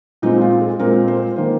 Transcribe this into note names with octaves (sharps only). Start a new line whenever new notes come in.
A#2 G#3 C4 D#4
F4
G#4
A#2 G#3 C4 A#4
C5
D#3 A#3 C5